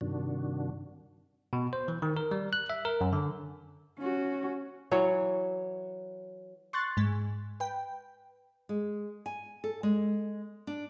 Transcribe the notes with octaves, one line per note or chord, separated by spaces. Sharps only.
G2 C3 D#3 D4 F#4
B2
C5
E3
D#3
A#4
G3
F#6
E5
A#4
F#2
D3
C#4 F#4
E3 F#3 C#5
C6 C#6 F#6 A6
G#2 G#3
B4 G5
G#3
G#5
A4
G#3
D4